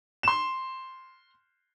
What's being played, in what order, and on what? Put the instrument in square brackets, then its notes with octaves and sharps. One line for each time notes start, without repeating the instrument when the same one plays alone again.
[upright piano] C6 E7